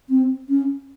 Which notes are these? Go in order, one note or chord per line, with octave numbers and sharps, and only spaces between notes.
C4
C#4